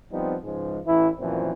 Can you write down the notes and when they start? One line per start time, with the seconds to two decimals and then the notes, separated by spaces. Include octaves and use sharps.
0.12 F3 G3 B3 C4 D#4
0.44 C#2 G#2 F3 G#3
0.86 A1 E3 E4
1.19 F#2 A#2 E3 F3 C4